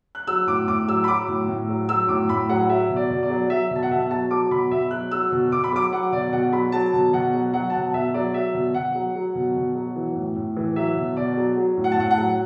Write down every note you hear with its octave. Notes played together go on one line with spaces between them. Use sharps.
F#6
F#3 E6
A2 D6
A2 D6
F#3 E6
B5
F#3 D6
A2
A2
F#3
F#3 E6
A2 D6
A2 B5
F#3 F#5
F#3 E5
B2
D5
B2
D5
F#3
F#3 E5
B2 A5
F#5
B2 E5
F#3 A5
F#3 D6
B2 B5
B2 E5
F#3 F#6
F#3 E6
B2
B2 D6
B5
F#3 D6
F#3 F#5
B2 D5
B2 F#5
F#3 B5
F#3 A5
B2
B2 F#5
F#3
F#3 F#5
A5
B2 F#5
B2 E5
F#3 D5
F#3 E5
B2
B2 F#5
F#3
F#3
B2
B2
F#3
E3
A2
A2
E3
F#3 E5
B2
B2 D5
F#3
F#3
A2
F#5
A5
A2 F#5
F#5
F#3